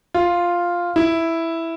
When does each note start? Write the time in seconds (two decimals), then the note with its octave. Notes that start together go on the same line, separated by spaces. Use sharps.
0.14 F4
0.96 E4